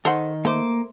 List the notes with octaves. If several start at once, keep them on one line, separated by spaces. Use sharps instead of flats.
D#3 D#4 A4 C5 D#5 F#5
A3 A#3 C5 D6